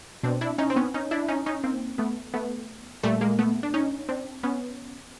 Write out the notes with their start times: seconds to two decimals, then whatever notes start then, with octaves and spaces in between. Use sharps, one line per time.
0.23 B2 C4 D4
0.41 D4 E4
0.58 C#4 D#4
0.70 C4
0.76 B3 C#4
0.94 C#4 D#4
1.11 D4 E4
1.28 C#4 D#4
1.46 C#4 D#4
1.64 A#3 C4
1.98 A3 B3
2.34 A3 B3
3.03 A#2 G3 A3
3.21 G#3 A#3
3.39 A3 B3
3.63 D4
3.74 C#4 D#4
4.09 C4 D4
4.43 B3 C#4